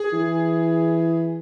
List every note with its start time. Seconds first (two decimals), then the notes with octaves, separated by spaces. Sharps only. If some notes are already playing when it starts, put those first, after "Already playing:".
Already playing: G#4
0.13 E3